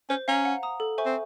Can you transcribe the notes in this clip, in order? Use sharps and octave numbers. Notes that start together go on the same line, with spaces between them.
C#4 C5
C#4 F5 A#5
F#5
A#5 D#6
A4
C5 E5 G#5 C#6
C4